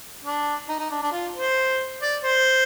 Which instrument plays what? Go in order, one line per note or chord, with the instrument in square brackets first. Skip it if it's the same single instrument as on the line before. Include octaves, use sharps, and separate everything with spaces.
[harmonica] D4
D#4
D#4
D4
D4
F4
C5
D5
C5